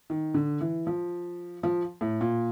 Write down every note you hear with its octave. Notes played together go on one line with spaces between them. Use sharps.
D#3
D3
E3
F3
F3
A2
A#2